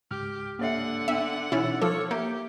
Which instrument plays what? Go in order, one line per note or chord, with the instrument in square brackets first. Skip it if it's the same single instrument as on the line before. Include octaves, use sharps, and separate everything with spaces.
[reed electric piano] C#2 G#2 F6 [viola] G4
[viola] D3 F#5 [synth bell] A#3 C#5 E5
[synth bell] B3 G5 E6 [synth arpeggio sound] E5
[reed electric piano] B2 E3 E6 [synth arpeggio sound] C#4 E4 [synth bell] D#4 A6
[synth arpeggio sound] F3 A4 [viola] C#5 [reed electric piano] D6 E6 F6
[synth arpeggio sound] A#3 [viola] G4 [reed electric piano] E5 [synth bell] G6